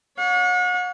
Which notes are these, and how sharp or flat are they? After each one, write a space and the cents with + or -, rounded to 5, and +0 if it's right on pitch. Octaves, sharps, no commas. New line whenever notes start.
C#5 +35 F#5 -40